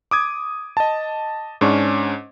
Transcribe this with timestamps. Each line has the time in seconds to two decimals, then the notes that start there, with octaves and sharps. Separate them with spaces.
0.11 D6 D#6 G#6
0.77 D#5 A5
1.61 G#2 C#4 D4 C#6